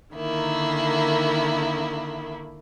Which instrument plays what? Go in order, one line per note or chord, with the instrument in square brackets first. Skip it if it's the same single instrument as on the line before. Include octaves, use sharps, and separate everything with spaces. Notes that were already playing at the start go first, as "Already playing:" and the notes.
[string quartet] D3 D#3 A#3 E4